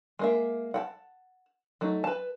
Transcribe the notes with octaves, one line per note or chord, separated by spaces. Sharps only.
G#3 A#3 E5
F#5 G5 A5
F#3 A3 D#4
B4 A5